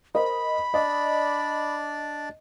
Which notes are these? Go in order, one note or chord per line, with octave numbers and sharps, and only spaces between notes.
A#4 C5 D#5 B5
D4 D5 D#5